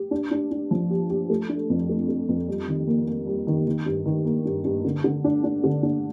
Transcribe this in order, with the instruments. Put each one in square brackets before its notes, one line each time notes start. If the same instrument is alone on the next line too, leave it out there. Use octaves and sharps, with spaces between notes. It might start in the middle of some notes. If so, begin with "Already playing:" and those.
Already playing: [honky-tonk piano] G4
D4
D4
D4
F3
G4
G4
A3
D4
F2
A3
A3
F2
G3
D#3
A#3
A#3
G3
D#3
D#3
G2
D#3
A#3
G2
G2
D3
D3
D4
D4
D3
D4